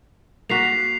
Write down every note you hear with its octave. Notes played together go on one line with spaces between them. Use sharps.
A#3 F#4 B6 C7 F7